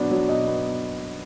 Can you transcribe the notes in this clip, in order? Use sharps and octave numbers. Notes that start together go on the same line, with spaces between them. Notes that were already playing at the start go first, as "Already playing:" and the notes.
Already playing: B2 F#3 B3 D4
F#3
B2 D#5
B3